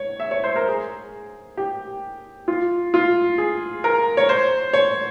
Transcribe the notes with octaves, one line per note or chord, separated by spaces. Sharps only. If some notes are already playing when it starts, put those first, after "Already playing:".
Already playing: C#5
E5
C#5
C5
A#4
G#4
G4
F4
F4
G#4
A#4
C#5
C5
C#5